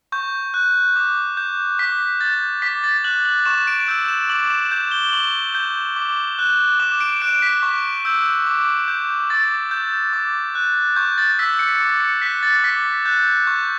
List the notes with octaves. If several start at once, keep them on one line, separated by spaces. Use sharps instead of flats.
C#6 G6
F#6
D6
G6
D6 B6
G6 A6
D6 B6
A6
F#6 F#7
F#7
C#6 E7
D7
E6 G6
E7
D6 F#7
E7
G6
G7
C#6 F#7
G6
D6
F#6
D6 E7
D7
F#6 D7
B6
C#6
E6 G6
D6
G6
D6 A6
G6
D6
F#6
C#6 G6
A6
E6 G6 B6
C#7
D6
C#7
F#6 B6
A6
D6 B6
F#6 G6
C#6 G6